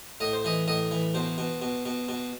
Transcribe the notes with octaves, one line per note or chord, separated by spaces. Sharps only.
A2 D#5
C5
E3 D#5
A2 D#5
E3
B2 C5
B2
B2
B2
B2